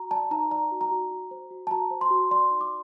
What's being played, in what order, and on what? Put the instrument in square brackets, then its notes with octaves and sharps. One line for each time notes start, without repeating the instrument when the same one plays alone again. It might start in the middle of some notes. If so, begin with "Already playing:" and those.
Already playing: [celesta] F#4 A#5
D5 A5
D#4 A#5
D5 A#5
F#4
A#5
F#4
F#4
C5
F#4
A5
F#4 A#5
C5
C6
F#4
D5 C6
D#4
D6